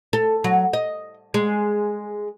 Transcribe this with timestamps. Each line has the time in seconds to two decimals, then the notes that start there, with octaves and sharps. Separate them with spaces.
0.13 A4
0.44 F#3
0.73 D#5
1.34 G#3